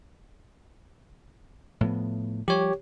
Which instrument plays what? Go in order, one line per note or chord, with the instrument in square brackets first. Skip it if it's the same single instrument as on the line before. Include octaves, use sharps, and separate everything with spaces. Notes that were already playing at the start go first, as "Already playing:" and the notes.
[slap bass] A2 F3 B3
[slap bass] F3 G3 [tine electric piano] G4 C#5